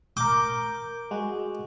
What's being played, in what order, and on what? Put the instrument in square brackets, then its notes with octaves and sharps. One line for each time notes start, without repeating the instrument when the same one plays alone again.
[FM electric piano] A#4 G6 [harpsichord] D6
[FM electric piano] G#3 F#4